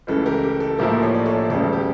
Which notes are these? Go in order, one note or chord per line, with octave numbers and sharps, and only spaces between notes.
C#2 C#3 E3 A3 A4
G4 A#4
G4
A4
A#1 A2 F3 A#3 E4 G4 A#4
A4 C#5
D5
A4 C#5
E1 D2 C#3 G3 A4
G4